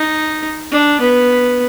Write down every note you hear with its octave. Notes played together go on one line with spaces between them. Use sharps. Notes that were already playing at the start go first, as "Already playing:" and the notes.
Already playing: D#4
D4
B3